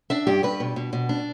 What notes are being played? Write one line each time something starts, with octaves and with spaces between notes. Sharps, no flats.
D4 E5
G2 G4
G2 B4
B2
B2
B2
D4